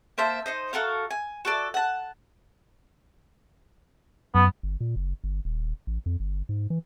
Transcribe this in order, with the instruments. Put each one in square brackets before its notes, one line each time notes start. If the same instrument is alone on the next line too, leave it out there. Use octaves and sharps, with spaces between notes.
[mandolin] A#3 C5 E5 A5
D#4 C5 D#5
F#4 A4 A#4 F5
G#5
F#4 A4 D5
F#5 A5
[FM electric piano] F#2 [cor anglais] B3
[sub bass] G1
A#2
F#1
G1
D#1
A1
F2
G1
G#2
E3